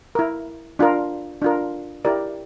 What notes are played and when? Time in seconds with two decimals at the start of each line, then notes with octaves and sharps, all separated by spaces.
0.15 E4 A#4
0.79 D4 F4 A#4
1.42 D4 F4 A#4
2.05 E4 G4 A#4 D5